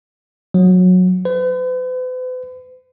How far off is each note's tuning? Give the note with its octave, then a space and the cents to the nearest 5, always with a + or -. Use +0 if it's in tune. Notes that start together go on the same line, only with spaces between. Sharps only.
F#3 -20
B4 +45